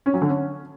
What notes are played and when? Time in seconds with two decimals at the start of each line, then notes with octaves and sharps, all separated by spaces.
0.06 C#4
0.14 F#3
0.22 D3
0.29 C#4